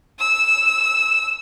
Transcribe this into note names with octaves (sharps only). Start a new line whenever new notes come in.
E6